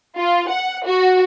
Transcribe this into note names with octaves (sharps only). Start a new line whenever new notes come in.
F4
F#5
F#4